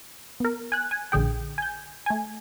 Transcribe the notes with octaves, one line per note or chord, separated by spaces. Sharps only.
B3 A#4
G#5 F#6
G#5
A#1 D3 G#4 G5
G#5 G6
A3 G#5